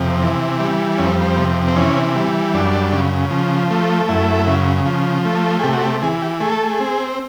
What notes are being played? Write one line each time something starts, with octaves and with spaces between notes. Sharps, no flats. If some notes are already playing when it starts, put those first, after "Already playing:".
Already playing: F2 C3
E3
G3
F2 C#4
C4
C4
C3
C4
E3 C#4
G3
F#2 D4
C#3
F3
A3
F#2 E4
C#3
F3
A3
G#4
C3 G4
F#4
G4
E3 G#4
G4
A3 G#4
A4
G#4
C4